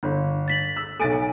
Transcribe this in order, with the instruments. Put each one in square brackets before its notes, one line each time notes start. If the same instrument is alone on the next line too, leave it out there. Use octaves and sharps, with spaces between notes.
[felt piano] G1
[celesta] A6 B6 F#7
[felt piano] E6
[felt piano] B1 A6 D#7 [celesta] A4 G#5 D7
[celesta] G#5